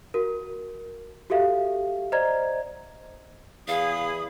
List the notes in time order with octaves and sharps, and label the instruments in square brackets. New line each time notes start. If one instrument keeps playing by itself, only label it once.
[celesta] F#4 A#4
F#4 G4 A4 E5 F5
C5 D5 D#5 A#5 G#6
[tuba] E2 [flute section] G#4 B5 D#6 [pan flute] F5